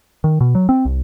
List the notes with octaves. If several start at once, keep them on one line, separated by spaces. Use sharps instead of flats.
D#3
B2
F#3
C4
C2